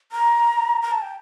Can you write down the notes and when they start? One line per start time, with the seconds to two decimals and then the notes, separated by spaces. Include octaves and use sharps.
0.12 A#5
0.82 A#5
0.91 A5
1.02 G5